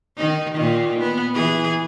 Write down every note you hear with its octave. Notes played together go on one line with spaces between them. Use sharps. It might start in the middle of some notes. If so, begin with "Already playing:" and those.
D#3 D#4
A#2 D#3
B3
E3 G#4